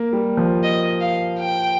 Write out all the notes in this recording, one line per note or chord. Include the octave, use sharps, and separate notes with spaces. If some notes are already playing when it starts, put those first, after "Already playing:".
Already playing: A#3
G3
F3
D#5
F5
G5